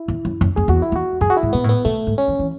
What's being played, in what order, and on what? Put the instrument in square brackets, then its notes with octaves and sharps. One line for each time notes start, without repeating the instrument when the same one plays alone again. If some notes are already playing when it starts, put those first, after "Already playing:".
Already playing: [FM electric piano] E4
[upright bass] E2
F#2
F#2
[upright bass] F#2 [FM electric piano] G#4
[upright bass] E2 [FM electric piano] F#4
[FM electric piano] E4
[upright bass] E2 [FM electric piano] F#4
[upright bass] F#2 [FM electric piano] G#4
[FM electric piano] F#4
E4
[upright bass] G#2
[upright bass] B2 [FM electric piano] B3
[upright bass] A2
[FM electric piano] B3
[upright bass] B2 [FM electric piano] A3
[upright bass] G#2
[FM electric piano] C#4
[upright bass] E3
E3